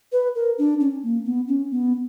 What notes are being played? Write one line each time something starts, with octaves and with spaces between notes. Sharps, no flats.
B4
A#4
D4
C#4
A#3
B3
C#4
B3